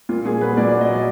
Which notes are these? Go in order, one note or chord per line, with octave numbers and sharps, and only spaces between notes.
A#2 F4
A#2 G#4
F#3 B4
A#2 D5
D5
F#3
D#5
F#3 D5